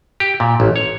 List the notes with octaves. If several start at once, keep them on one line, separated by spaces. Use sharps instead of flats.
G4
A#2
A1
C#5